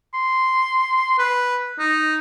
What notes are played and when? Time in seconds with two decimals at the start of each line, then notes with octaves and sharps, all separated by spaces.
0.14 C6
1.19 B4
1.79 D#4